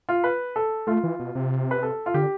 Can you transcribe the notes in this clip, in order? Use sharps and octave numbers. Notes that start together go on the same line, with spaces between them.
F4
B4
A4
A3 F4
E3
B2
C3
B4
A4
F4
D3 G4